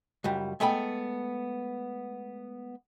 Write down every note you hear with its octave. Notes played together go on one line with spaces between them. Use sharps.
C#2 F#2 G3
G#3 A3 B3 G5 B5